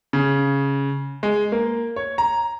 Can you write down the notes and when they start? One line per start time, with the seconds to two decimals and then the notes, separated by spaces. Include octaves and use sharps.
0.13 C#3
1.23 G#3
1.52 A#3
1.96 C#5
2.18 A#5